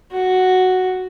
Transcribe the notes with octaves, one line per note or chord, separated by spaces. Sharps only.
F#4